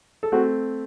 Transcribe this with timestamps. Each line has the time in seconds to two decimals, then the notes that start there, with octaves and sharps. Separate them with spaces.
0.23 A4
0.32 A3 C4 F#4